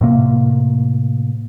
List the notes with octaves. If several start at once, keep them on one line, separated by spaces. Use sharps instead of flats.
A2 C3 A#3